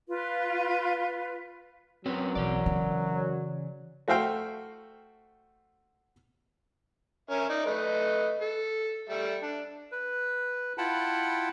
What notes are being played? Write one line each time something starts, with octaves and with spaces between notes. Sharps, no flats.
F4 B4
F#2 F#3 C4 C#4 B4
B1 E3 D5
C#3
A3 F#4 C5 E5 F5 G5
C#4 A#4 E5
D#4 D5
A3 B4 D#5
A4
G3 A4 E5
D4
B4
E4 F4 F#5 G5 A5 B5